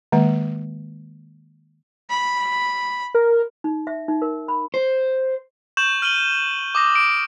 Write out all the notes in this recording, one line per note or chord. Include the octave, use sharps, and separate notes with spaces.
D#3 G#3 A#3
B5
A#4
D#4
E5
D#4
A#4
B5
C5
C#6 G6 E7 F#7
F6 D#7 F#7 G7
D6 D#6 A#6
D7